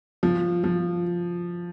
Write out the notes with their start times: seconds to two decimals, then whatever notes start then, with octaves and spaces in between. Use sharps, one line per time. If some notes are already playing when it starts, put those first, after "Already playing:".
0.23 F3
0.64 F3